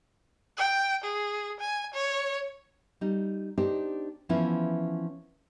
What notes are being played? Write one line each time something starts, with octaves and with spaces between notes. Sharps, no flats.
G5
G#4
G#5
C#5
G3 D#4
D4 D#4 G4 C5 D5
E3 F3 B3 C#4 E4 F4